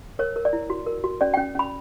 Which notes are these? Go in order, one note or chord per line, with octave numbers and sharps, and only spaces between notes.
A#4 C#5
A#4
D5
E4
F#4
A#4
F#4
C#4 D5
C#4 G5
C#4 B5